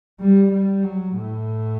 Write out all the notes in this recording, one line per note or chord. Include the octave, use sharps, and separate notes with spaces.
G3
G3
F#3
A2